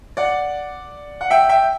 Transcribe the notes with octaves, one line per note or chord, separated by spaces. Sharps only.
D5 F#5
F#5
E5 G5
E5 G5